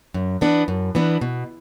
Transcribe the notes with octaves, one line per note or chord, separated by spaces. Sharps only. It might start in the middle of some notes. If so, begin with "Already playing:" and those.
F#2
E3 B3 D4
F#2
E3 B3 D4
B2